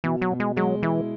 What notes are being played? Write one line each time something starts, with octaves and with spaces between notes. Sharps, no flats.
B2 E3
F#3
B2
G#3
F#3 G#3
E3 E4